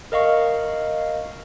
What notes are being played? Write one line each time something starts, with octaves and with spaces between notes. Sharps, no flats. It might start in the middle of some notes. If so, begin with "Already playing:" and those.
A#4 D#5 F5 C#6